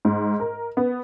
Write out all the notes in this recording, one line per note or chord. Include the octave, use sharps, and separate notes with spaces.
G#2
A#4
B3